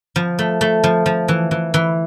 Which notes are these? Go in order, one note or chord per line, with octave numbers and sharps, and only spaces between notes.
F3
A3
A3
F3
F3
E3
E3
E3